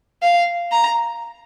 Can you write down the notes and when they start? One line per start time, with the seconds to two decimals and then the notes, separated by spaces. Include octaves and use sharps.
0.22 F5
0.72 A#5